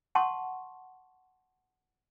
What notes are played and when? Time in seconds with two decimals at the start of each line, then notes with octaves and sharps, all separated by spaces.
0.15 F#5 A5 C6 C#6